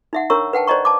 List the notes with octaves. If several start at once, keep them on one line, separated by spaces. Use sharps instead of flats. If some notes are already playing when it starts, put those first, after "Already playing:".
D#4 E5 F#5
D4 A#4 C#5 A#5 C#6 E6
B4 F#5 G5 A5
C5 D5 D#5 A#5 C#6
A5 D6